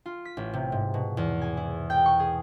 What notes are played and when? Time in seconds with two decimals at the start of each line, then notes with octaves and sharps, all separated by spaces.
0.06 F4
0.25 B6
0.37 A1
0.54 C3
0.72 G#2
0.94 B2
1.17 E2
1.41 G#5
1.57 E4
1.90 G5
2.06 C#6
2.20 G#4